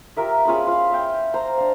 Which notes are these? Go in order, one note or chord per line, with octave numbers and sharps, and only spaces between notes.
F4 G4 A#4 E5
C#4 F4 G#4 B5
F4 F5
E5 F5 G5
C5 A#5
D4 F5